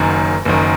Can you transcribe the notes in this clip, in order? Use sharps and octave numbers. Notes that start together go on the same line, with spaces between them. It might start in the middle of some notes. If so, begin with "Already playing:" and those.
Already playing: F#1 F#2 D#3
F#1 F#2 D#3